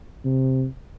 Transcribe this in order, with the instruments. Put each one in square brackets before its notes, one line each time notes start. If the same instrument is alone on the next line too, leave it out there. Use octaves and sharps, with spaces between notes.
[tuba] C3